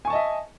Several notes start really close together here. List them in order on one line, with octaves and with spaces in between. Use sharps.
G#5 C#6 A5 D#5 E5